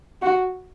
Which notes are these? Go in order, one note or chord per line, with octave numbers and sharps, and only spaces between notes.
F#4